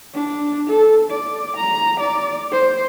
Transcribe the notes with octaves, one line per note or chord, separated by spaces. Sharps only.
D4
A4
D5
A#5
D5
C5